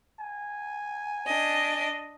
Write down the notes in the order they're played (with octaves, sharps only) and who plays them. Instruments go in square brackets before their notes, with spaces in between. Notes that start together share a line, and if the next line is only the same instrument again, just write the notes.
[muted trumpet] G#5
[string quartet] D4 D#5